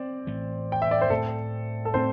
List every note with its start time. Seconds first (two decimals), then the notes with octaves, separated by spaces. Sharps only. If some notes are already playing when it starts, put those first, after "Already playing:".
Already playing: C4 D5
0.27 A2 E3 A3
0.72 G5
0.82 E5
0.91 D5
1.01 C5
1.10 A2 A3 C4 A4
1.85 A4
1.94 A2 A3 C4 C5